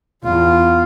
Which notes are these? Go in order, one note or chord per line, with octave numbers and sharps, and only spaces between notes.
E2 F4